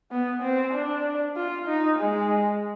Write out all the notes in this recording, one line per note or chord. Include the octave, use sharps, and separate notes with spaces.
B3
C4
D4
F4
D#4
G#3